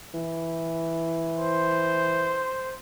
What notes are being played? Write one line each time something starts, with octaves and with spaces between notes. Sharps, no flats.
E3
C5